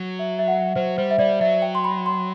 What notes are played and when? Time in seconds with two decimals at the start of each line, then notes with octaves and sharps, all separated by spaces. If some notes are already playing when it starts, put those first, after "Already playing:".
Already playing: F#3
0.19 E5
0.39 E5
0.48 F#5
0.76 F#3 C5
0.98 G3 C5
1.11 E5
1.19 G3 D5
1.41 F#3 E5
1.62 G5
1.75 C6
1.84 B5
2.06 C6